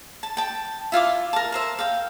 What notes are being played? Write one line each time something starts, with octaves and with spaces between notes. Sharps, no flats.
A5
G5 A5
E4 F4 F5 D6
A#4 A5
A#4 C5 E5
F5 G5